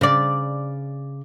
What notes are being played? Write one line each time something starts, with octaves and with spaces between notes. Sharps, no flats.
C#3 D5